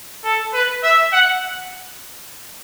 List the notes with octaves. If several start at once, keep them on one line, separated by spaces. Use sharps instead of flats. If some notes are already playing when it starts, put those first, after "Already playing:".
A4
B4
E5
F#5